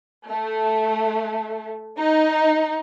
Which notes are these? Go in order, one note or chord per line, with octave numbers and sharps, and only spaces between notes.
A3
D#4